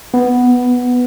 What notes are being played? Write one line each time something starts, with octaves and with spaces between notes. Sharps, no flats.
B3